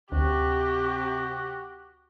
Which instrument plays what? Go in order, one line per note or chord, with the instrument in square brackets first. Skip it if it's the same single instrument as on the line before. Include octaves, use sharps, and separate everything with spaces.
[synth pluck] D2 [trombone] C3 [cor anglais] F#4 [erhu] G4